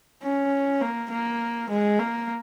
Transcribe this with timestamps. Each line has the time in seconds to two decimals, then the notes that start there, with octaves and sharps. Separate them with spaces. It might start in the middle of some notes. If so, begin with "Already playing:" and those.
0.22 C#4
0.81 A#3
1.10 A#3
1.70 G#3
1.99 A#3